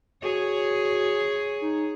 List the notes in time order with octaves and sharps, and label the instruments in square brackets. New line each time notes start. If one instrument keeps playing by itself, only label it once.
[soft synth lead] F#4 [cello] G#4 C#5
[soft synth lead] D#4